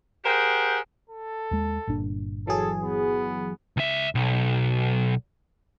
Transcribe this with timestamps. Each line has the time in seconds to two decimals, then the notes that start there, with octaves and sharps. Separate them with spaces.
0.25 G4 G#4 A#4 C5 F#5 G5
1.10 A4
1.51 D#2 G#3
1.87 G1 A#2 D4
2.47 E3 F#3 G#4 A4
2.83 B3
3.77 C#2 E5
4.15 B1